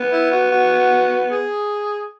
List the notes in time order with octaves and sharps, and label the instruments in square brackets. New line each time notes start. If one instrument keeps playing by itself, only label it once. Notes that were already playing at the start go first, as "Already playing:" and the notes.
Already playing: [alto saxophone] B3
[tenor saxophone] E4
F#4
F#4
G#4